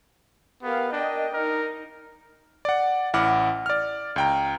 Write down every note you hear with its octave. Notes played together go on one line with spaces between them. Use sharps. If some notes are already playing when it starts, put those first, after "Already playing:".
B3 G4 A#4 F5
D4 A#4 D#5 G5
D#4 A#4
D5 F#5
A1 E4 F#5 D6 F6
D5 F6
C#2 G5 A#5